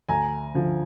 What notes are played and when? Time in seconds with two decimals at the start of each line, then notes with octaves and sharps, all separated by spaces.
0.09 D2 G#5 A#5
0.54 D3 F3